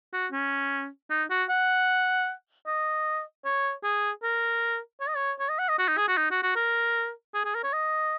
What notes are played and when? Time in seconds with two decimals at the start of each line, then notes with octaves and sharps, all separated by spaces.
0.13 F#4
0.32 C#4
1.10 D#4
1.30 F#4
1.50 F#5
2.67 D#5
3.45 C#5
3.84 G#4
4.23 A#4
5.01 C#5
5.08 D#5
5.16 C#5
5.39 C#5
5.49 D#5
5.59 F#5
5.69 D#5
5.79 F#4
5.88 D#4
5.97 G#4
6.08 F#4
6.17 D#4
6.31 F#4
6.43 F#4
6.56 A#4
7.34 G#4
7.45 G#4
7.55 A#4
7.64 C#5
7.73 D#5